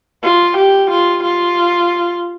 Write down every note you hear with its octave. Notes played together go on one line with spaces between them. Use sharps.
F4
G4
F4
F4